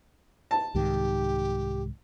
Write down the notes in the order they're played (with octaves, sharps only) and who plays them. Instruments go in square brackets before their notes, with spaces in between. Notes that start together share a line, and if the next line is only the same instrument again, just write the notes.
[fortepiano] A5
[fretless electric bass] C2 G#2 D#3 [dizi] G4